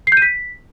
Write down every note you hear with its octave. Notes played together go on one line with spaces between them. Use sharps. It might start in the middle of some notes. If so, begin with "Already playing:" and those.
C7
G6
D#7
B6